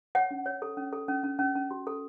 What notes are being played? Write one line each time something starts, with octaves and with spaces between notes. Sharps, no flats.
C#5 F#5
C#4
C#5
A4
C#4
A4
C#4
C#4
C#4
C#4
F#4
A4